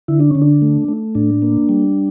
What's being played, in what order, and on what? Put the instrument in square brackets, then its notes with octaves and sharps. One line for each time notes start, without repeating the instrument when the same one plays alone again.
[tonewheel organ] D3 E4
D4
D3 C#4
D4
A3
A3
A2 D4
A#3
G3